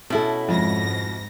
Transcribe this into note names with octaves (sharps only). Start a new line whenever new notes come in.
B2 C#4 E4 A4
F2 G#2 A#6